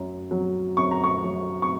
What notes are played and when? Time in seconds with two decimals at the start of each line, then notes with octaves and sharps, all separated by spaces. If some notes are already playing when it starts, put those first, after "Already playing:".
Already playing: F#2 F#3
0.31 F#3
0.77 F#2 C#6
0.91 A#5
1.04 C#6
1.24 F#3
1.62 C#6